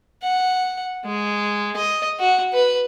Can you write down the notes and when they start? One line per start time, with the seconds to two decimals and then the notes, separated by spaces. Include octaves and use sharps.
0.23 F#5
1.05 G#3
1.76 D#5
2.20 F#4
2.53 B4